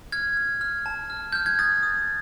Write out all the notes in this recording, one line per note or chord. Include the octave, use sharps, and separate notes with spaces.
F6 G#6
F6
F6
A5
F6
F6 G6
G#6
D#6 A6
D#6